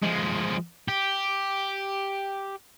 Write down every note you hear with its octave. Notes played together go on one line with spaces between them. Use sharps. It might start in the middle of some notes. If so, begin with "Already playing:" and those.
F3 G#3
G4